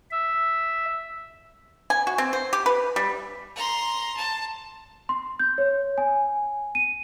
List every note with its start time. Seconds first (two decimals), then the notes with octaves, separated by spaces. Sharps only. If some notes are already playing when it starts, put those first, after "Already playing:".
0.11 E5
1.90 G#5
2.07 F#4
2.18 C4
2.33 C5
2.53 G4
2.66 B4
2.96 G3
3.56 A#5 C6
4.16 A5
5.09 C6
5.39 G6
5.58 C#5
5.98 G#5
6.75 D#7